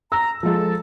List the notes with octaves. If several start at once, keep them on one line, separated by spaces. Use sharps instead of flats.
A#5 E6
F3 G#3 A4